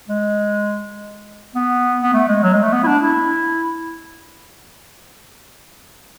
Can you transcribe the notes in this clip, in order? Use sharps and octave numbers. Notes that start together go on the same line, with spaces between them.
G#3
B3
B3
A3
G#3
F#3
G#3
A3
B3
E4
D4
E4